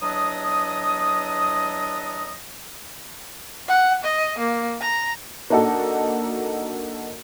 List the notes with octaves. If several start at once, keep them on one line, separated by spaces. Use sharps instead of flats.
E2 F#3 D4 D#5 D#6
F#5
D#5
A#3
A#5
A#3 D4 D#4 F#4 A4